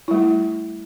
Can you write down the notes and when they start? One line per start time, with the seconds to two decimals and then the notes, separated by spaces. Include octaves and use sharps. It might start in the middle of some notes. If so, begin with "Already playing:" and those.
0.08 E4
0.11 G3
0.14 A3